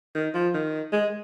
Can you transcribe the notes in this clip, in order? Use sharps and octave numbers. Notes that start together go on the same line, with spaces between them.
D#3
F3
D#3
G#3